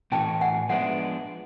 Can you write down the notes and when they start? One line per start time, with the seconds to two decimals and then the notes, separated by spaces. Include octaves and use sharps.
0.12 A2 E3 A3 C#4 F#4 G5 A5
0.41 F#5 G#5
0.69 F3 G#3 B3 D4 E5 F#5